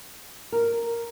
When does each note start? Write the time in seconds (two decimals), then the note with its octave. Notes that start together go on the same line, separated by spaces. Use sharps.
0.52 A#4